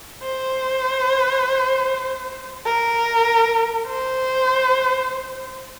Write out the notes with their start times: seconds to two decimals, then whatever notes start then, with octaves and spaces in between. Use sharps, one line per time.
0.23 C5
2.66 A#4
3.87 C5